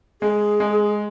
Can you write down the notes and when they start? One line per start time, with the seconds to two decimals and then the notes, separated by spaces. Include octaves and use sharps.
0.22 G#3 G#4
0.60 G#3